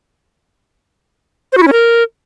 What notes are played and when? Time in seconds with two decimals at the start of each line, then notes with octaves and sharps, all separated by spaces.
1.52 C5
1.57 F#4
1.62 E4
1.67 C#4
1.72 A#4